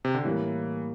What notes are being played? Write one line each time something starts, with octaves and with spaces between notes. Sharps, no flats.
C3
D3
A2 E3 G3 A#3